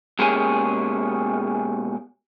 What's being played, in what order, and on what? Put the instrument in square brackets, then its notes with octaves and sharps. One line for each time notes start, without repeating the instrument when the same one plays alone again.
[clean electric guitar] B2 G#3 A#3 C#4 G4 G#4